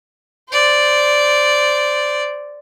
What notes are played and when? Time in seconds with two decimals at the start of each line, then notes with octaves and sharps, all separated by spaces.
0.49 C5 D5